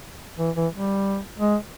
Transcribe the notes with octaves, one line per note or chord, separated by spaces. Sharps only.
E3
E3
G3
G#3